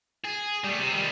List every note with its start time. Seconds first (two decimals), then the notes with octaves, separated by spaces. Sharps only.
0.25 G#4
0.64 G3 A3
0.78 C3
0.93 D#3 G3